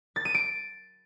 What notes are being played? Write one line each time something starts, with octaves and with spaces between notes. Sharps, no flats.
A6
D#7
D7